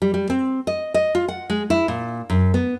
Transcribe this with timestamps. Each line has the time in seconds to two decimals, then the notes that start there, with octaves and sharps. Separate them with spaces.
0.02 G3
0.14 G3
0.30 C4
0.67 D#5
0.94 D#5
1.15 F4
1.28 F#5
1.50 G#3
1.70 E4
1.88 A#2
2.30 F#2
2.54 B3